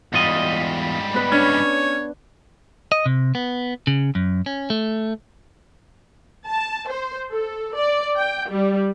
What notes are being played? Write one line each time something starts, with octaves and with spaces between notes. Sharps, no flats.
E2 G#2 G3 F4 D#5
B3 B4
C#4 D4 C#5
D#5
C3
B3
C#3
F#2
C#4
A3
A5
C5
A4
D5
G5
G3